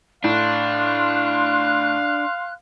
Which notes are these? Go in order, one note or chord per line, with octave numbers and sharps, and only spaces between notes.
A2 D4 F5 C6 F#6